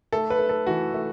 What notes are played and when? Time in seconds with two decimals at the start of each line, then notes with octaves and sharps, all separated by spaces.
0.12 A3 A4
0.30 B4
0.39 A3
0.49 A4
0.67 E3 F#4
0.94 A3